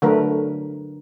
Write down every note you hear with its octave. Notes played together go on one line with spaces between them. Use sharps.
D3 F#3 A3 A#4 B4